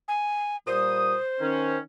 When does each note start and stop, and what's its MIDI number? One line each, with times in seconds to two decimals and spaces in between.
0.08 0.56 80
0.67 1.16 46
0.67 1.16 55
0.67 1.78 72
0.67 1.16 87
1.40 1.77 51
1.40 1.77 61